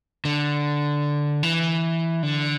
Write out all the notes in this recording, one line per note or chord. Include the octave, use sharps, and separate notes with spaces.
D3
E3
D3